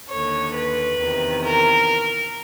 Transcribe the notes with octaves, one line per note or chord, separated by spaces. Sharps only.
D#2 D3 C#5
B4
E2 C3 D#3
A#4